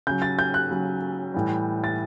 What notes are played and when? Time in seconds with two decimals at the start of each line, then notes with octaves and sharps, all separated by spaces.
0.07 C#3 F#3 G6
0.22 A6
0.39 G6
0.54 F#6
0.71 C#3 F#3
1.34 A2 E3 G3
1.84 A6